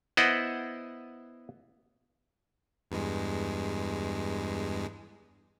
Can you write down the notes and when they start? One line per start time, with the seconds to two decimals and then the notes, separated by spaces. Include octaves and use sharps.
0.17 B3 E4 C5 D#5 F#5
2.91 E2 G2 G#3